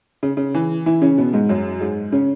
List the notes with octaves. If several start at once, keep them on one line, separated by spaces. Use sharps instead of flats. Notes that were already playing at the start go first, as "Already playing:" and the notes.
C#3
C#3
E3
E3 E4
C#3 C#4
B2 B3
G#2 G#3
F#2 F#3
G#2 G#3
C#3 C#4